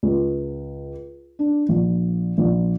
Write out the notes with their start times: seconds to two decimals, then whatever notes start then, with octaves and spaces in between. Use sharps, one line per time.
0.03 C#2
1.39 D4
1.69 A#1
2.38 A#1